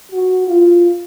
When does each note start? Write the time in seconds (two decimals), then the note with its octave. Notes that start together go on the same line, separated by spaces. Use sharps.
0.12 F#4
0.48 F4